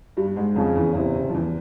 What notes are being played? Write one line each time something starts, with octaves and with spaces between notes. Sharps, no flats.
G2 G3
G#2 G#3
F2 C#3 F3
E2 E3
E2 C3 E3
C#3
F3
E2 E3